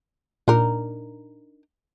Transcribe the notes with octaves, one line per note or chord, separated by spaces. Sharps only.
A#2 D4 D#4 A#4